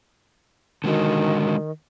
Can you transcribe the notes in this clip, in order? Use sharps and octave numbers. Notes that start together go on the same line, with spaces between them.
D3 D#3 G#3 F#4